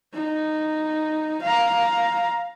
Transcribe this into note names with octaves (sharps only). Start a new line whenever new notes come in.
D#4
F5 A#5